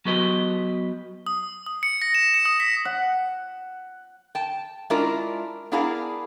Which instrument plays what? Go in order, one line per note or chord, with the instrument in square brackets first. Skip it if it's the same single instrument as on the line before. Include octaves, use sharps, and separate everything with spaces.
[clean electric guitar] F#3 B3 F#4 G4 B4 D#5
[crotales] D#6
D#6
C#7
A#6
E7
C#7
D#6
B6
[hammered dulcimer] F#5
[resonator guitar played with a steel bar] G5 A5
G#3 C#4 D4 E4 F4 A#4
B3 D4 E4 G#4 A#4 F5